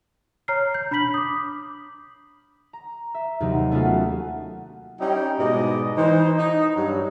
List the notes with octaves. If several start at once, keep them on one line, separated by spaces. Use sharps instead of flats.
C#5 A#5 F6 C7
G6
D4 B5 G6 B6 F#7
D6 D#6
A#5
E5
D#2 C3 F#3 D#4
A3 B3 C#4 F4 F#4 A4
G3 C#4 D#4 E4 G5
G#2 B2 G#3 D5 D#5
E3 D#4 C5
D#4
G2 F#3